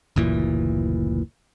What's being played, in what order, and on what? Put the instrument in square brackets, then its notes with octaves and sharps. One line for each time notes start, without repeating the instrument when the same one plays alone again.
[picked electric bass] F#1 D2 A#2 E3